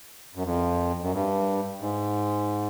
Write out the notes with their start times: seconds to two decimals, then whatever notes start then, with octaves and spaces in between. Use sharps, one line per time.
0.35 F#2
0.44 F2
1.02 F#2
1.13 G2
1.80 G#2